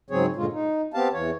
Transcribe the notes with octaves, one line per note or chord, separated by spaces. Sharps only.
G#2 C#3 F#3 C4 G#4 C#5
G2 A#2 D3 G#3 F4
D#4
B3 C4 G4 F5 A5
E2 E3 C#5